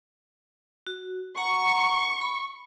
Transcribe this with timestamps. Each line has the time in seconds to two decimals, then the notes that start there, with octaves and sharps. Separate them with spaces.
0.87 F#4
1.37 F#5 A#5 C#6
2.21 B5